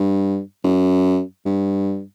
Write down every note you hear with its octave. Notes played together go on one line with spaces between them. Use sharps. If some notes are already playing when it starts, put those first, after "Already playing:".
Already playing: G2
F#2
G2